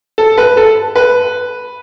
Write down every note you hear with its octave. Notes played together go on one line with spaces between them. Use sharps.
A4
B4
A4
B4